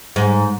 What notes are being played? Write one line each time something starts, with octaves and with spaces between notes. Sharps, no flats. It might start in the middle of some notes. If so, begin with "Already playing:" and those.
G#2